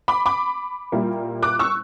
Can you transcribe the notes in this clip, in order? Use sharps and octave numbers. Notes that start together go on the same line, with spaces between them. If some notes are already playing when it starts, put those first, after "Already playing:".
B5 D6
B5 D6
A#2 G3 A#3 E4
D6 F#6
C#6 E6